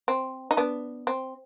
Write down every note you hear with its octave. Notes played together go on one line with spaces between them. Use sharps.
C4
D#4
B3 D4
C4